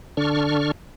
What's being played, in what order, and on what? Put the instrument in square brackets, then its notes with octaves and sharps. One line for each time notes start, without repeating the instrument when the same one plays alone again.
[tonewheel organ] D3 D4 C#6 F6